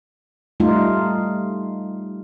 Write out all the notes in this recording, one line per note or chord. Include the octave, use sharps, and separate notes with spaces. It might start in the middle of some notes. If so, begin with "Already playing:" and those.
G3 A3 D#4 F4